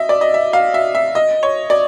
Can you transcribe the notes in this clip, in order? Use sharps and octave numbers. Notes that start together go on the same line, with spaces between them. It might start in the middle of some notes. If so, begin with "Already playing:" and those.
Already playing: D#5 E5
D5
D#5
E5
F5
E5
E5
D#5
C#5
D5